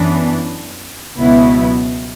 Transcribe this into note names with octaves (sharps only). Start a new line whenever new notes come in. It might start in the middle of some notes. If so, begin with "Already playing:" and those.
Already playing: F#2 E3 B3 D4
C#2 B2 F#3 B3 E4